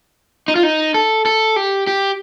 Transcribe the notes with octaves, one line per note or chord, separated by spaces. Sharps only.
D#4
F4
D#4
A4
A4
G4
G4